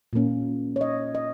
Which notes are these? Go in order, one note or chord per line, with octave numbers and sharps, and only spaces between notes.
A#2 A#3 C#4
C#5
D#5
D#5